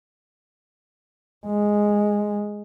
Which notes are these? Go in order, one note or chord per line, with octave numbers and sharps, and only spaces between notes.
G#3